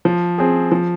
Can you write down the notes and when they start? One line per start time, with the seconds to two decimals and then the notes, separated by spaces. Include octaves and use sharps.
0.05 F3
0.38 C4 G#4
0.72 F3